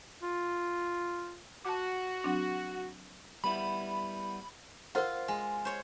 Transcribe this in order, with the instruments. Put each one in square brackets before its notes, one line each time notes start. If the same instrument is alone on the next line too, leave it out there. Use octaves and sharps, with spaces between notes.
[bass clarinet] F4
[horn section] F#4 [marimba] A5 D6
[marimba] F#3 C4 D4
[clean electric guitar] G3 B3 E4 [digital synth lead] B5
[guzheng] F4 C6 [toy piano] A#4 C5 F#5
[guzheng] G#3
C5 C#5